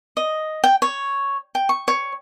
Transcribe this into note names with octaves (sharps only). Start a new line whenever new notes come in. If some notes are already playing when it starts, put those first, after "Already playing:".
D#5
G5
C#5
G5
C#6
C#5